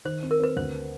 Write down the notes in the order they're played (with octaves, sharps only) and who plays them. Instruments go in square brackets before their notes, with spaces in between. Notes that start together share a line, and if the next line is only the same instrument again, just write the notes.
[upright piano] D#3 [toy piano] C5
[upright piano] C4
[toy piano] A#4
[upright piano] C4 [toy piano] B4
[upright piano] D2 [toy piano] C5